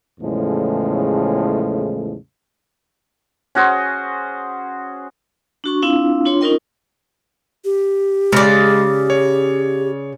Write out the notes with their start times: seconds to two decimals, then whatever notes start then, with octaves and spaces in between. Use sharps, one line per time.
0.20 E2 A2 C#3 F3 G#3 A3
3.55 C#4 F#4 G#4 C5
5.64 D4 F#4 C#6
5.82 C4 D4 E4 F4 F5
6.25 D4 F4 C#5 C6
6.41 C#4 D#4 F4 A#4 D#5 G5
7.65 G4
8.33 C#3 G#3 D5
9.10 C#5